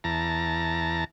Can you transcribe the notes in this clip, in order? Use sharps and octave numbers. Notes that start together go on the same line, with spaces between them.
E2 A5 A#5